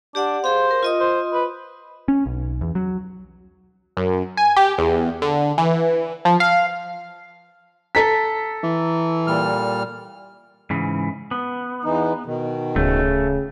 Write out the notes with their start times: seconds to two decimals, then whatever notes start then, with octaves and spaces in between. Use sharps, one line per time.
0.15 D4 G4 D5 F#5
0.44 G#4 C5 F5
0.71 A#4
0.83 F4 D#5 D#6
1.00 C5
1.34 B4
2.08 C#4
2.26 B1
2.61 E2
2.75 F#3
3.97 F#2
4.37 G#5
4.57 G4
4.78 E2
5.22 D3
5.58 E3
6.25 F3
6.40 F5
7.95 A4 A#5 B6
8.64 E3
9.27 A#2 G3 F6
10.70 G#2 C#3 E3
11.31 B3
11.85 E2 E3 D#4
12.26 B2 D#3
12.76 D1 C#3 A3